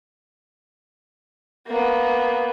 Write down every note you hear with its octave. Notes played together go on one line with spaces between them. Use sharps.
A#3 B3